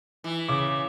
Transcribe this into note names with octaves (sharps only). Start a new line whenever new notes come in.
E3
C#3 D6